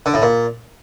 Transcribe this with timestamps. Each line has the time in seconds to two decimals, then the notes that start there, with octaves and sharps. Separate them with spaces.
0.06 D3
0.14 A2
0.22 A#2